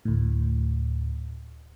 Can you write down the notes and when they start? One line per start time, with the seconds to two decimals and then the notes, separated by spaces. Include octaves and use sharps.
0.05 D2 A2